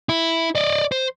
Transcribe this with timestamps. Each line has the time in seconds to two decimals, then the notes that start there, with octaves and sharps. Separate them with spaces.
0.09 E4
0.55 D5 D#5
0.92 C5